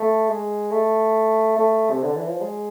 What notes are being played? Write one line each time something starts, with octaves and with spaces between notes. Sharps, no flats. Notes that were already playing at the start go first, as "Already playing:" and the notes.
Already playing: A3
G#3
A3
A3
C3
D3
E3
F3
G#3